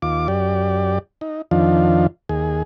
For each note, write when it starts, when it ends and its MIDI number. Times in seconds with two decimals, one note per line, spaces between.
0.02 0.28 39
0.02 0.28 65
0.02 0.28 86
0.28 0.99 42
0.28 0.99 67
0.28 0.99 74
1.21 1.42 63
1.51 2.07 41
1.51 2.07 51
1.51 2.07 53
1.51 2.07 62
1.51 2.07 65
2.29 2.63 39
2.29 2.63 68